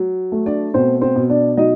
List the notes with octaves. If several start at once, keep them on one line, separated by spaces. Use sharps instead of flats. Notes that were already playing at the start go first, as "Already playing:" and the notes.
Already playing: F#3
A3
D4 D5
B2 C4 C5
C4 C5
B2
D4 D5
F#3 D#4 D#5